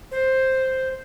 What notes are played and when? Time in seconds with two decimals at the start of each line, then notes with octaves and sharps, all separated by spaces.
0.11 C5